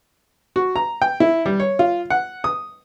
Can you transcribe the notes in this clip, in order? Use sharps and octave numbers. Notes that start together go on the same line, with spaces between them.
F#4
A#5
G5
E4
G3
C#5
F4
F#5
D#6